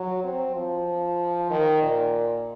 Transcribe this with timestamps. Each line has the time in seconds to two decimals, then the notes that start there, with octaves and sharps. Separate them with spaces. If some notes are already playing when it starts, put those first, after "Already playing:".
Already playing: F#3
0.24 C4
0.56 F3
1.50 D#3
1.82 A#2